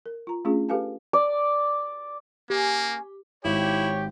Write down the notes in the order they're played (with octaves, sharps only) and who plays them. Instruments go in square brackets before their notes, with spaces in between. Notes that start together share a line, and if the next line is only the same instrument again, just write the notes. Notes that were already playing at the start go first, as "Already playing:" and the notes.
[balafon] A#4
F4 A#5
A3 C#4 D4 F4 G#4
G4 A4 B4 F5 G#5 A5
[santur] D5
[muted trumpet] A#3 [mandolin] C#4 G#4 [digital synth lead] G4
[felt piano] G#1 [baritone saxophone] E4 [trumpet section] G4 [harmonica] C#5